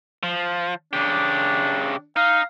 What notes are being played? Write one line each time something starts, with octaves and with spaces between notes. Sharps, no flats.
F3
C#3 D4 G4
D#4 F5